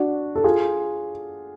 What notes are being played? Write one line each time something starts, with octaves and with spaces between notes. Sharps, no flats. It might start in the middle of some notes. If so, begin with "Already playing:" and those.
Already playing: D4 F#4
A4
F4 G#4